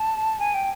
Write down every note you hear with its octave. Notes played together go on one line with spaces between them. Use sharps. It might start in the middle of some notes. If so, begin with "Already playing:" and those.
Already playing: A5
G#5
G5